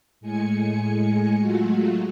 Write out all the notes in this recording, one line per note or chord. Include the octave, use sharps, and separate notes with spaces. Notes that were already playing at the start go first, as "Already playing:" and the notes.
A2 G#3 G#5 C#7
F#3 G#3 A3 F4 F#4